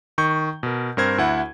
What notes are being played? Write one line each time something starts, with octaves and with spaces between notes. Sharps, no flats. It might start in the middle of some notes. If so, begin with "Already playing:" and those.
D#3 C#6 G6
B2 A#4
G2 C4 A#4 C5 G#6
D2 E4 F#5